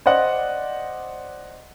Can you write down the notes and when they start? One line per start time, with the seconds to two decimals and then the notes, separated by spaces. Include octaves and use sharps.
0.06 C5 D5 D#5 F#5